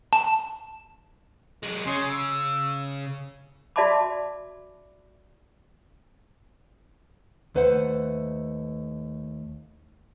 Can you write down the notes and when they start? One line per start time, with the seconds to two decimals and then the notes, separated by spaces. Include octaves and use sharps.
0.13 A5
1.63 F#3 G#3
1.86 C#3 G#4 C#5 C6
2.09 E6
3.76 F#4 D5 E5 A5 B5 D6
7.55 D#2 A3 B4 C5 F#5